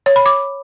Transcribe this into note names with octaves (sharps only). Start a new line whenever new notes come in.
C#5
B5
D6